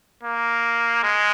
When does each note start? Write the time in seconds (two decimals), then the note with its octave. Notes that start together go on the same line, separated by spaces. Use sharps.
0.23 A#3
1.04 G#3